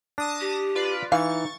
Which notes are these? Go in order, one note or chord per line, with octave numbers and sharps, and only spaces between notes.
D4 A5 D#6 A#6
G4
F4 B4 D5
E3 D#4 F5 C#6 A6